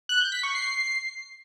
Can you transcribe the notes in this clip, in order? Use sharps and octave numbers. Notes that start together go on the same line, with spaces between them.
F#6
G6
B6
C#6
C7